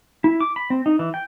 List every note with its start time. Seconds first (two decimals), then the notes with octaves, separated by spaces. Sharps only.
0.24 E4
0.41 D6
0.56 B5
0.70 C4
0.86 D#4
0.99 E3
1.14 G5